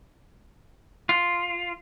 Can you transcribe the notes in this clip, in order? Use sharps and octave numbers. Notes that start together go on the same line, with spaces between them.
F4